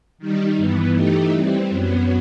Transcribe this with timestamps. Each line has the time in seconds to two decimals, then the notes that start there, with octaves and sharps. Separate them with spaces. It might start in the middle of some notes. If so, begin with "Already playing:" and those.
0.18 D#3 G3 D#4
0.57 G2 E3 B3
0.94 E3 A3 D#4 G4
1.32 E3 G3 C4
1.70 F#2 F#3 B3